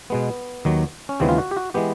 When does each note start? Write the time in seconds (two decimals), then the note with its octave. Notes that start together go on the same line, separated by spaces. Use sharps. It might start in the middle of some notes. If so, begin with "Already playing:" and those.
0.10 B2 G#3 B3
0.65 D#2 D#3 F#3
1.09 C#4
1.20 D#2 C#3 E3 G#3 B3 C4
1.29 F4
1.38 F#4
1.51 G4
1.57 F#4
1.74 E3 G#3 B3 G4